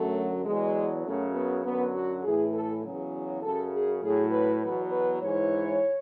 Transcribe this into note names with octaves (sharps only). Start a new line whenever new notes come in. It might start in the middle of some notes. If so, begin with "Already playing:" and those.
Already playing: F#2 D3 F#3 A3
E2 B2 F#3 G#3
F#2 C#3 F#3 A3
B3
F#2 D3 F#3 B3
F#4
A2 E3 G#4
A4
E2 C#3 F#3
F#2 C#3 F#3 A4
G#4
A2 F#3 G#4
B4
E2 B2 F#3 B4
B4
G#2 E3 C#5